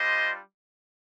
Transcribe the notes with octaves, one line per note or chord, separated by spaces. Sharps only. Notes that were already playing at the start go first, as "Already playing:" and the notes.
Already playing: G3 D4 F4 C5 D#5